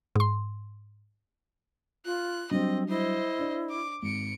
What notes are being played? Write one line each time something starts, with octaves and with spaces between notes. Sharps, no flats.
G#2 C6
F4 F#6
F#3 G3 C4 D4 D#5
E4 C5 D#5
D4 D5
D6
G#1 C#7 D7